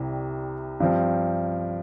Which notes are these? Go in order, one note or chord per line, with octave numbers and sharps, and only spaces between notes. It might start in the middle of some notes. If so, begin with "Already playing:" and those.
Already playing: C2 C3 G3
G2 F3 C4